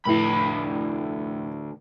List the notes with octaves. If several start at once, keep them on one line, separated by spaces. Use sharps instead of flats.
F1 D2 A2 E4 B5